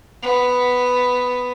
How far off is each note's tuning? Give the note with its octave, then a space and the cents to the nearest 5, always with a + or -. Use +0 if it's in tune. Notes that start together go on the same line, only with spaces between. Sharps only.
B3 +5